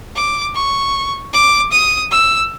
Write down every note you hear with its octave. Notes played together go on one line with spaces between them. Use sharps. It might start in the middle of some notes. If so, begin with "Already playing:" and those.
D6
C#6
D6
D#6
E6